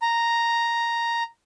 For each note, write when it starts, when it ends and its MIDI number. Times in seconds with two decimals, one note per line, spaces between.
0.02 1.23 82